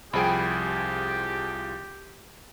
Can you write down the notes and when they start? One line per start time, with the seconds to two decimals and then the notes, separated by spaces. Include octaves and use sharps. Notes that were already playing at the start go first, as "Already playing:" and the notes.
0.13 C2 F3 G4 G#4 G5 G#5 B5